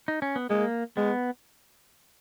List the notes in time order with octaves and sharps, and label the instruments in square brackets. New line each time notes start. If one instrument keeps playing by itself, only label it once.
[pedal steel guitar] D#4
C#4
B3
[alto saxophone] G#3 [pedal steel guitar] A#3
[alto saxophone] G#3 [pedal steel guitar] B3